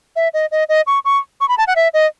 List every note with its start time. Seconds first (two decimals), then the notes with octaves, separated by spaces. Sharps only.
0.16 E5
0.34 D#5
0.51 D#5
0.69 D#5
0.87 C#6
1.05 C#6
1.41 C#6
1.49 B5
1.58 A5
1.67 F#5
1.76 E5
1.94 D#5